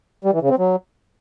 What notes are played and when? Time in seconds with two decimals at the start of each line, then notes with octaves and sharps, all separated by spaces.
0.24 G3
0.33 E3
0.42 C#3
0.50 C4
0.59 F#3